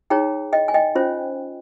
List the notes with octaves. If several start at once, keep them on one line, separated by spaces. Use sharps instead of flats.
D#4 G#4 C#5 G5 A#5
D#5 G5
G#5
D#5 G5
C#4 F4 C5